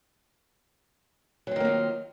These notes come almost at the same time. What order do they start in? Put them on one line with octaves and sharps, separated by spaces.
F#3 C4 D#3 A#3 F4